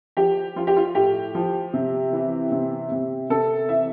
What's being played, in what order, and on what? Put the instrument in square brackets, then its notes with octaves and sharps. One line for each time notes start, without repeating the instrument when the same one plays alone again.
[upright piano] F3 G4
F3 F4
G4
F4
A2 G4
F3
C3
E3
C3
C3
C3 A4
E3 E5